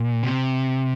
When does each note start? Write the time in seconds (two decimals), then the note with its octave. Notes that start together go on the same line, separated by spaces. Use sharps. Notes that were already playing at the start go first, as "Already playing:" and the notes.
Already playing: A#2
0.23 C3